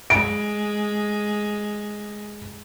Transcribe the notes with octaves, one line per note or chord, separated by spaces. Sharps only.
G#3 D7